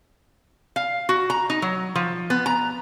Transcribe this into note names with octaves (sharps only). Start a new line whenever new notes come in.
F5
F#4
A#5
D#4
F#3
F3
B3
A#5